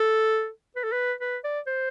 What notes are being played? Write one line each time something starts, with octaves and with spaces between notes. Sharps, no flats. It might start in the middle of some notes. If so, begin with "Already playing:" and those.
Already playing: A4
B4
A4
B4
B4
D5
C5